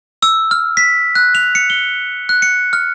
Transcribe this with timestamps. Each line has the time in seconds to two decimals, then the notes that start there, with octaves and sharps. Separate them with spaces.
0.23 E6
0.51 F6
0.77 B6
1.15 F#6
1.35 F7
1.55 C#7
1.70 G7
2.29 F#6
2.42 C#7
2.73 F6